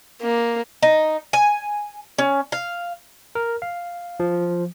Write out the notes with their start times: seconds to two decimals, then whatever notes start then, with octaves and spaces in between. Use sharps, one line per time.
0.22 A#3
0.83 D#4
1.33 G#5
2.19 C#4
2.52 F5
3.35 A#4
3.62 F5
4.20 F3